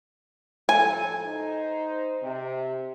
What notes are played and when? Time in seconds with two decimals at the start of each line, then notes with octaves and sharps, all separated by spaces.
0.69 A2 F3 A4 G#5
1.26 D#4 C5
2.22 C3